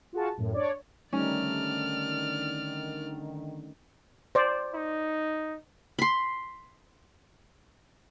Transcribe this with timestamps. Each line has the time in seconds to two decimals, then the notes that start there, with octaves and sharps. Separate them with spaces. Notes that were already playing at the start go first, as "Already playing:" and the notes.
0.13 F4 F#4 G#4 A5
0.37 F#2 A2
0.54 D4 C#5 D5
1.13 D3 D#3 G3 A3 C#4 D#4 D5 F6
4.35 C5 D5
4.74 D#4
5.99 B5 C6